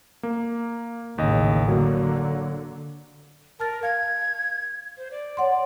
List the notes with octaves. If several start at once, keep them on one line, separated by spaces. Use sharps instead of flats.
A#3
A1 D#2 C#3 D#5
D3 F#3 A#3
A#4 A5 F6 A6
F5 G#6
C5
D5
C#5 F#5 C6